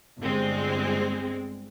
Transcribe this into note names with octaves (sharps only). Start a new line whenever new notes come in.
G1 G#3 C4